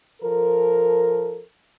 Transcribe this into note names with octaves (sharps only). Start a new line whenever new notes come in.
F3 A4 A#4